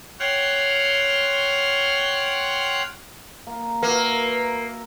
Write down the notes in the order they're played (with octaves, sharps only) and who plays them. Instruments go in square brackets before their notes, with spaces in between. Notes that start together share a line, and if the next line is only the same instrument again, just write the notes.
[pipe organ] C#5 F#5 G5 C6 F6 G6
[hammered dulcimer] A#3
[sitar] A#3 [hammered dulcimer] F#4 E5 [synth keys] B4